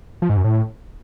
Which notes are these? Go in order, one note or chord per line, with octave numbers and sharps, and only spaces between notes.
F3
G#2
F#2
A2